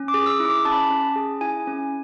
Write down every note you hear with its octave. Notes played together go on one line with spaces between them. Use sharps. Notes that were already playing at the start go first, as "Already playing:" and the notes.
Already playing: C#4
D6
G#4
E6
E4
D6
C#4 A5
B5
A5
C#4
G#4
E4 G#5
C#4